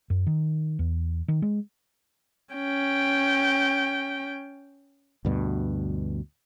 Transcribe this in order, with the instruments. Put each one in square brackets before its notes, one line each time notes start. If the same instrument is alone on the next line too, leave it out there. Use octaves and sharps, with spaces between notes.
[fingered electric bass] F#2
D#3
E2
D#3
G#3
[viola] C#4 G5
[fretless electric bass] D2 G2 B2